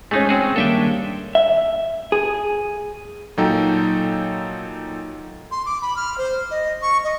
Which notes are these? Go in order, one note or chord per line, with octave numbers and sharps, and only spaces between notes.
G#3 A3 C#4 D#4 G#5
C4 F#4 G#4
D#3 G3 A#3 D4 A4 E5 G5
E5
G#4
A#2 F#3 D#4 A4 G5
C6
D6
B5
F6
C5
D#5
C#6
D#5